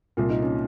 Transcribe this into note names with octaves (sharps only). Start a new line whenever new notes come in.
C2 A#2 F4
D#4
C#4